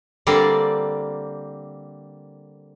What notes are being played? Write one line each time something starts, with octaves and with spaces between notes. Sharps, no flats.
D3 G3 A#3 C4 D5